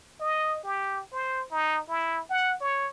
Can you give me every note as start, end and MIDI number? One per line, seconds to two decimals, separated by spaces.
0.20 0.61 75
0.64 1.02 67
1.12 1.45 72
1.51 1.81 63
1.88 2.21 64
2.30 2.55 78
2.61 2.88 73